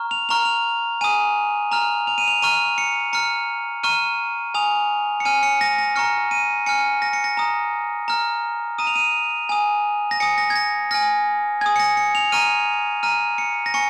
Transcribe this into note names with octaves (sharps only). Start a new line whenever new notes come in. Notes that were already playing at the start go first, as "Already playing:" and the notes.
Already playing: A#5 C#6 F6
F7
A#5 C#6 F6 F7
F7
G#5 D#6 D#7
A#5 F6 F7
F7
D#7
F7
A#5 C#6 F6 D#7
C#7
A#5 F6 C#7
A#5 C#6 F6 D#7
G#5 D#6 F7
C#7
G#5 F6 D#7
C#7
A#6
A#6
A#5 C#6 F6 C#7
D#7
G#5 F6 C#7
A#6
C#7
A#6
A#5 D#6
A#5 F6
A#5 D#6 D#7
F7
D#7
G#5 D#6
A#6
G#5 D#6 C#7
A#6
G#6
A#6
G#5 F6 A#6
G#5 D#6 G#6
C#7
A#6
C#7
F7
A#5 C#6 F6 D#7
A#5 F6 D#7
C#7
A#6
G#5 C#6 C#7